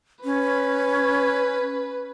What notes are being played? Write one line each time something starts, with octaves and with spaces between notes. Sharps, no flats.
C#4 B4